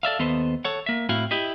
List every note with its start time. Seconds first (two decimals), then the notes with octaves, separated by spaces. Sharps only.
0.03 A4 D5 E5 F5
0.19 D#2 B3 A4 C5 D#5
0.65 A4 C#5 F#5
0.86 A#3 E5
1.09 A2 C4 E4 F#4 F5
1.31 E4 G4 D#5 E5